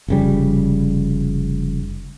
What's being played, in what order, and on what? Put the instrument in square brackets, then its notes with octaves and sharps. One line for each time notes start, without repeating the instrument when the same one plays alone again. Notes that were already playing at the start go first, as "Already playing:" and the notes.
[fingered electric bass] F1 C#3 G3